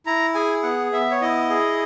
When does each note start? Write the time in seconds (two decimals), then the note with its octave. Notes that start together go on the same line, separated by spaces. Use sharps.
0.06 E4 A#5
0.34 G#4 G#5
0.63 B3 F#5
0.92 B3 E5
1.11 C#5
1.21 E4 D#5
1.50 G#4